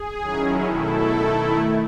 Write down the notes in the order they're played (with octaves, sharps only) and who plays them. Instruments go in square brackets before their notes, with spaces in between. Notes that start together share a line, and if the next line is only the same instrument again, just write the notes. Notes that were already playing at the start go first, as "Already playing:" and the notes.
Already playing: [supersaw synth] G#4
D#3 F#3 C#4 E4
B2 A3 E4 A4
D#3 A3 E4